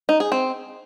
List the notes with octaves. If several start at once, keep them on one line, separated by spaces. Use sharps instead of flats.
D#4
G#4
C4